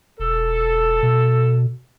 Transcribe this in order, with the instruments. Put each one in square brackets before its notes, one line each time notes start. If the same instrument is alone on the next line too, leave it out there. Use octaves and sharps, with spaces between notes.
[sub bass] E1 [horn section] A4
[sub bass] B2